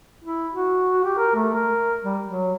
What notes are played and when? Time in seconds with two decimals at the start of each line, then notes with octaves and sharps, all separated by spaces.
0.25 E4
0.53 F#4
1.04 G4
1.18 A#4
1.35 A3
1.55 A#4
2.03 G3
2.27 F#3